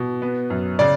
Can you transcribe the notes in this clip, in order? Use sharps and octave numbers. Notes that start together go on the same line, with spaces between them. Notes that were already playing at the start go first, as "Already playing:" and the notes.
Already playing: B2
B3
F#2
C#3 D5